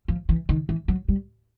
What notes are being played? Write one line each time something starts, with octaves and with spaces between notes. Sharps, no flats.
F3
E3
D#3
E3
F#3
G3